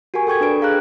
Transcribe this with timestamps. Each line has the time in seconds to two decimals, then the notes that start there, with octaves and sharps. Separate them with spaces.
0.14 F#4 G4 A#4 G#5 C#6
0.27 A4 G5 C#6 G#6
0.41 D4 A4 B4 D7
0.61 G#4 F5 A#5 F#6